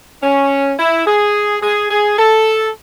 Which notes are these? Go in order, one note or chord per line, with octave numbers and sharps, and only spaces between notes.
C#4
E4
G#4
G#4
G#4
A4